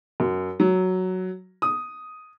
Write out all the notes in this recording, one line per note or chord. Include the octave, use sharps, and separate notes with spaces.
F#2
F#3
D#6